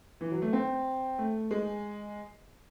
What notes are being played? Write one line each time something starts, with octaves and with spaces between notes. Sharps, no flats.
E3
F#3
A3
C4
A3
G#3